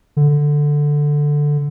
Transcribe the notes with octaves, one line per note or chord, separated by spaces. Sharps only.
D3